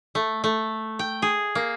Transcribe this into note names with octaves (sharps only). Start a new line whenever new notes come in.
A3
A3
G5
G#4
A#3